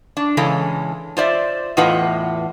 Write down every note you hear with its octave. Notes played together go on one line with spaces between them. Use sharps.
D4
C#3 E3 G#3 C#4 A4
F4 C5 D5 E5
E2 A2 F4 B4 D#5 F#5